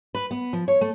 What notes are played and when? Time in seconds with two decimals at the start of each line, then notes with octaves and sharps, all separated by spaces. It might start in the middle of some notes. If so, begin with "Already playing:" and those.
0.15 B4
0.31 B3
0.53 F3
0.68 C#5
0.81 A3